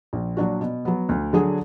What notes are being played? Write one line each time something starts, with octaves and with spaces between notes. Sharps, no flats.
A#1
A#2 F#3 D4 F#4
B2
F#3 B3
D2
D3 F#3 D4 G#4